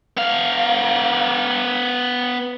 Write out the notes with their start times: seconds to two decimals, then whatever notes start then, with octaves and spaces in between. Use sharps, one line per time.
0.17 B3 F5